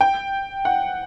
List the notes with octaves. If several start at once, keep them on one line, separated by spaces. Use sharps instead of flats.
G5
F#5